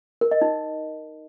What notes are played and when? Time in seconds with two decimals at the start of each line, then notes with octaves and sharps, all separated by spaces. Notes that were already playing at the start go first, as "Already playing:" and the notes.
0.21 A#4
0.31 D#5
0.42 D#4